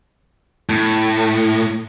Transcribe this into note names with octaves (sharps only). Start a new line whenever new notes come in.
A2